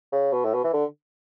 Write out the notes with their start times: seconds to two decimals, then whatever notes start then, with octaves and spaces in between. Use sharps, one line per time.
0.12 C#3
0.32 B2
0.44 A2
0.54 B2
0.64 E3
0.74 D3